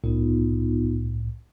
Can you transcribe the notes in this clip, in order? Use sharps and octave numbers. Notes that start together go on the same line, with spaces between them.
C2 A2 B3 D#4 F4